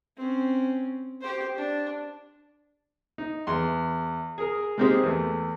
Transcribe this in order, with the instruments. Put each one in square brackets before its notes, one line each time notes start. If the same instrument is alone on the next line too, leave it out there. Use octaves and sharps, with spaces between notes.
[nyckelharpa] C4 C#4
G4 C5
D4
[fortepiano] D#4
E2 C6
G#4 A#4
G#3 A#3 C4 D#4 G4 G#4
E2 A3